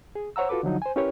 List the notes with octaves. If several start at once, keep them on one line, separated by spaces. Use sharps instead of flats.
G#4
C5 C#5 F#5 A#5 E6
F4 F#4 A4 B4 D6
D3 F3 F#3 D#4
C5 G#5
C#4 E4 G4 A#4 B4 C#5